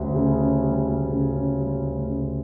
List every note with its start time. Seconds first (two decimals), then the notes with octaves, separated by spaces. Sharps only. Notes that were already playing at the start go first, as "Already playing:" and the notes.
Already playing: D2 G3 C#4
0.15 C#3
0.39 C#4
0.63 G3
0.87 D2
1.10 C#3
1.35 C#4
1.58 G3
1.83 D2
2.06 C#3